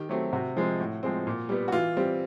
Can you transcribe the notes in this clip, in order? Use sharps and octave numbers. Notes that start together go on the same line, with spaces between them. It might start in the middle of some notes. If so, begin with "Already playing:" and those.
Already playing: D#3 G4
F#3 A3 C4
C3 F#4
F3 G#3 C4
A2
F3 G#3 C4
A#2
G3 B3
F#4
E3 F4
G3 C4